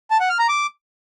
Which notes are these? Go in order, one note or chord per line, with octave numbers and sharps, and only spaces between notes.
A5
F#5
F6
A#5
D6